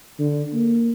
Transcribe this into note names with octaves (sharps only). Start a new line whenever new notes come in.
D3
A#3